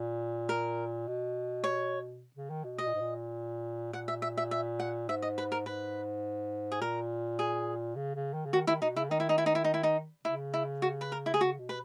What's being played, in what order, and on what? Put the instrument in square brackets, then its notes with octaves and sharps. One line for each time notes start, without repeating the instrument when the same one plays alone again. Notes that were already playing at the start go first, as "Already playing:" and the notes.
Already playing: [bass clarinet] A#2
[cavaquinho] A#4
[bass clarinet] B2
[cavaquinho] C#5
[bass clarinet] C#3
D#3
B2
[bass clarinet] B2 [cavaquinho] D#5
[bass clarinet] A#2
G#2
A#2
[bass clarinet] A#2 [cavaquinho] F#5
[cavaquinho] E5
E5
E5
E5
F#5
[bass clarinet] G#2 [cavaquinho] E5
[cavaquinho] D#5
B4
A#4
[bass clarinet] G#2 [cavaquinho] B4
[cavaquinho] G#4
[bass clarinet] A#2 [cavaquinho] A#4
[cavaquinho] G#4
[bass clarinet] C#3
C#3
D#3
C#3
[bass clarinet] D#3 [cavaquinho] F#4
[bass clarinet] D#3 [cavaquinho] E4
[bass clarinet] B2 [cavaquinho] D#4
[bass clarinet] C#3 [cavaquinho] E4
[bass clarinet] D#3 [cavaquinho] D#4
[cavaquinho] E4
D#4
E4
D#4
E4
D#4
E4
D#4
[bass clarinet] C#3 [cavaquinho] E4
[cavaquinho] E4
F#4
B4
A#4
E4
G#4
[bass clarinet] C#3 [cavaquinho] F#4
[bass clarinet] B2
[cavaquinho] B4